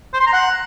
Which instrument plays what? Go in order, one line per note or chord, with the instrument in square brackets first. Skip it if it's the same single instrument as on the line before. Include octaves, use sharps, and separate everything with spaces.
[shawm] C5
C6
A#5
F#5